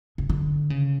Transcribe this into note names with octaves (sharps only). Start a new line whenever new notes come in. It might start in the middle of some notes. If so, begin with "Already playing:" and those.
C#3
D3
C#3